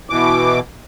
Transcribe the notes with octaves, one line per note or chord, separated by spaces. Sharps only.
B2 E3 D6